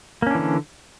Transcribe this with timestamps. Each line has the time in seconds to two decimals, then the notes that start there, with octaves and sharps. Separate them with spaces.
0.22 A#3
0.27 C#4
0.31 D4
0.35 E3
0.39 D3